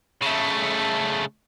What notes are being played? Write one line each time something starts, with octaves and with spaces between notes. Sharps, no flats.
C#3 A3